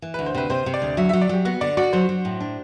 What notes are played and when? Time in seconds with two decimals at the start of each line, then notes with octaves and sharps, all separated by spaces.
0.02 E3
0.14 D2 B4
0.26 C5
0.35 C3 B4
0.50 C3 C5
0.66 C3
0.74 D5
0.82 D2
0.97 F#3 E5
1.09 F#3 E5
1.21 D5
1.29 F#3 G4
1.45 B3 F#4
1.61 D3 D5
1.77 F#4 D5
1.93 F#3 C5
2.09 F#3
2.25 A2
2.40 D4